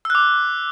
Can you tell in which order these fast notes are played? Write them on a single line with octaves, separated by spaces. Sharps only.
E6 F#6 D6